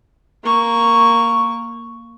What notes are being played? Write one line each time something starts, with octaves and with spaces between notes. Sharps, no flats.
A#3 C#6